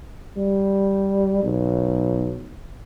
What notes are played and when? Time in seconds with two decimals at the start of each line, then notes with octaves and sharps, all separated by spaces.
0.37 G3
1.43 B1